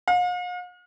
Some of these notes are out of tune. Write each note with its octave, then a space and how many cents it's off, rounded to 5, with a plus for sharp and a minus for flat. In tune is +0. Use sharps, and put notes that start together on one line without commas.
F5 +45